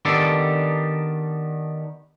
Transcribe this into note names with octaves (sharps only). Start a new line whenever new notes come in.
D#3 B3 D4 G4 A4